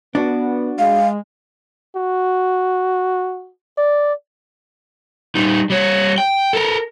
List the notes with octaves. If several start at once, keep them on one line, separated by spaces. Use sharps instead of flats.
B3 D4 F#4
G#3 F5
F#4
D5
G3 D#4
G3 C#5
G5
A4 A#4